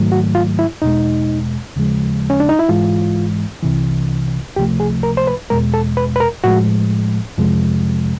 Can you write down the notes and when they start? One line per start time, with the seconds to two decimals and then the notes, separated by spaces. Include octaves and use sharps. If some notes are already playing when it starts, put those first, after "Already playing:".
Already playing: G#2 D#3 F#3 A3
0.12 F#4
0.35 F4
0.59 E4
0.82 E2 B2 G#3 D#4
1.76 D#2 C#3 F3 G#3
2.30 C#4
2.40 D4
2.49 D#4
2.59 E4
2.69 G#2 E3 G#3 F4
3.63 C2 C3 E3
4.56 C#2 C3 F3 A3 G4
4.80 G#4
5.03 A#4
5.17 C5
5.27 B4
5.50 E2 B2 G#3 A#4
5.74 A4
5.97 B4
6.16 B4
6.20 A#4
6.44 A2 F3 G#3 F#4
7.38 F2 C3 F3 G#3